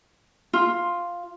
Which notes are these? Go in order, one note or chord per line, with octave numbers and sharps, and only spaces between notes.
F4